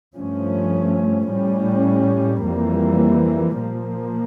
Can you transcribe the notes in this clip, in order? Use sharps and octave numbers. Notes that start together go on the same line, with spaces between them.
G2 F3 A3 C#4
A2 G3 C#4
F2 E3 G3 A#3
A#2 F3 A#3